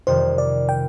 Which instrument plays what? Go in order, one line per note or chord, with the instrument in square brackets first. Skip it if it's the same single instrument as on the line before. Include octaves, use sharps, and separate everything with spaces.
[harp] F2 C3 D#3 G3 [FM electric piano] C5
[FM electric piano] D5
G5